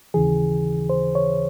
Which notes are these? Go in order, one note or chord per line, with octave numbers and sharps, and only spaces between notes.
D#2 C#3 E3 G#4
C5
C#5